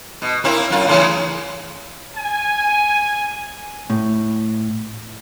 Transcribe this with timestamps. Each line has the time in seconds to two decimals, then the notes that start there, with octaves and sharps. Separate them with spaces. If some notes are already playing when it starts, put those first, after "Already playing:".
0.22 B2
0.44 A#3 C4 E4
0.70 F#2 F4
0.87 A2 C#3 E3
2.16 G#5
3.90 A2